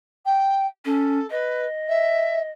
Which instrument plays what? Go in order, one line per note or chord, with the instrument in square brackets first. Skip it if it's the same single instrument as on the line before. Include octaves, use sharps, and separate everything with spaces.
[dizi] G5
[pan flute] C#4 [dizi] A4
[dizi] B4 [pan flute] D#5
[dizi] E5